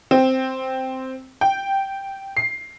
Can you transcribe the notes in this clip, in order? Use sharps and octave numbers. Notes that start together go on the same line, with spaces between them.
C4
G5
C7